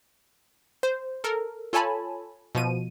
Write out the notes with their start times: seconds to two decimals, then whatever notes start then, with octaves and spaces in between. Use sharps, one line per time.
0.83 C5
1.24 A4 A#4
1.73 F4 A4 C#5 G#5 A5 B5
2.55 B2 F3 D#7